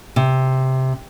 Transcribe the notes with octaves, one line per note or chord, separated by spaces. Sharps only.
C3